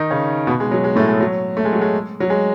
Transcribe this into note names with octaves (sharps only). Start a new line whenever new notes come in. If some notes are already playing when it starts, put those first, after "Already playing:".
Already playing: D#3 D#4
C#3 C#4
B2 B3
G#3
F#3
G#3
A2 A3
G#3
F#3
A3
G#3
F#3
G#3
F#3
G#3